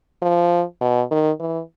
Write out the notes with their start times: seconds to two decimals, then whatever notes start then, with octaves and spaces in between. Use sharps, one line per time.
0.22 F3
0.81 B2
1.11 D#3
1.40 E3